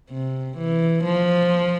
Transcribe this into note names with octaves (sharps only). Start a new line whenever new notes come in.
C3
E3
F3